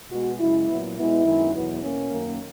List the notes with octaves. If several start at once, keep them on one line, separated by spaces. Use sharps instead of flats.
B2 G#3 B3 F#4
F#2 C#3 G#3 E4
A#2 F#3 B3
B2 G#3 B3 E4
F#2 D#3 G#3 B3
E2 B2 F#3 B3
B2 A#3 C#4
F#2 D#3 A#3